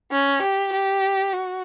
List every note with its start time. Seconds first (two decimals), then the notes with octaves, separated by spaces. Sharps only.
0.12 C#4
0.42 G4
0.73 G4
1.33 F#4